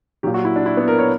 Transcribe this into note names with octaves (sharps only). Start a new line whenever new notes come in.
A#2 F#3 G4
F#4
E4
D4
E4
B3
A#4
C#5